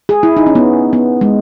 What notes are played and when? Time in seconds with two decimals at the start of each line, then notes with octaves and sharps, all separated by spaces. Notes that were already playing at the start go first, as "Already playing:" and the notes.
0.09 G#4
0.23 E4
0.37 D#4
0.46 C#4
0.55 B3
0.93 B3
1.21 G#3